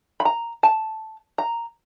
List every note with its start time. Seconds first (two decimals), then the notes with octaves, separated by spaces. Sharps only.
0.20 B5
0.25 A#5
0.63 A5
1.38 A#5